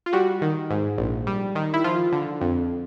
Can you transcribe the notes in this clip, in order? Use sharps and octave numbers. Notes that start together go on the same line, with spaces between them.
F4
G3 F#4
D#3
G#2
A#1
G3
D#3
E4
F3 F4
D3
F2